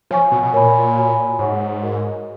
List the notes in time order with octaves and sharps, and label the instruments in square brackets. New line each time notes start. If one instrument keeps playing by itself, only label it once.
[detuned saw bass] F3 [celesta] C#5 G#5 C#6
[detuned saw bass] B2
B2
[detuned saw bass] A#2 [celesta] A#4 C#5 G#5 B5
[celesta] F#4 C#5 G#5 B5
[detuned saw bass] G#2 [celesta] C#5 F#5 C#6
[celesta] F#4 A#4 D#5